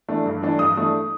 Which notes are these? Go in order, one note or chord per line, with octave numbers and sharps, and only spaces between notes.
E3 A3 D4
G2
E3 A3 D4
G2 D#6
E3 A3 D4